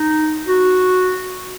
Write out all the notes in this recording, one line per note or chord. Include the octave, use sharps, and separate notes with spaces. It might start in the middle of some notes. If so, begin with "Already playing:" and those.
Already playing: D#4
F#4